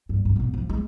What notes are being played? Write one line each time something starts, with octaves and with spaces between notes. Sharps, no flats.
G2
G2
B2
G#2
F3
G#3